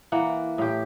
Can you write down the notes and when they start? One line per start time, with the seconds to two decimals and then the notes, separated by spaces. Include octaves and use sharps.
0.12 E3 A#3 F#5
0.58 A2 G4